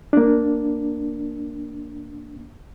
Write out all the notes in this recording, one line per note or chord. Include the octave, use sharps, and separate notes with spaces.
A#3 D4